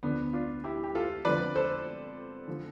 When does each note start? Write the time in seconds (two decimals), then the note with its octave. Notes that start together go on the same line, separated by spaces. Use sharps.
0.03 D2 D3 F3 B3 D4
0.33 D4 F4
0.64 E4 G4
0.84 G4
0.95 F4 A4
1.25 F2 D3 F3 B4 D5
1.55 A4 C5
2.48 D3 F3